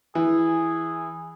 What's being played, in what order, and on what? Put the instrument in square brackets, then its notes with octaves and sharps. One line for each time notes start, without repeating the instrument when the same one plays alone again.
[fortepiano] E3 [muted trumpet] G#4